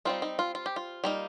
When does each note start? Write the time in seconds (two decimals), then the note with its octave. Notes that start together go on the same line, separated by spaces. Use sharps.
0.05 G3 C4 D#4 F4
0.22 D#4
0.39 F4
0.55 F4
0.66 G4
0.76 F4
1.04 G3 A#3 D#4